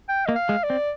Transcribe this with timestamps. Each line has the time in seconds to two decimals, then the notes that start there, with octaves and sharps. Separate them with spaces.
0.09 G5
0.26 A#3 D#5
0.35 F5
0.49 G#3
0.63 D5
0.70 C4